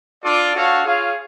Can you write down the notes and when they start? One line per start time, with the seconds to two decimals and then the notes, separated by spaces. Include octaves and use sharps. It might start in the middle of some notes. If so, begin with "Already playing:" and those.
0.23 D4 F4 A4 D5
0.55 D4 F#4 A4 C#5 F5
0.85 F4 G#4 C#5 F5